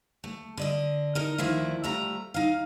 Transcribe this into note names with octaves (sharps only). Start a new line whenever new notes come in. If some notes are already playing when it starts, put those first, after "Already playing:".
A3
D3 D5 D#5
D#4 A#4
D2 D#3 F3 E4 E5
F3 G3 A3 E5 A#5
D#4 F5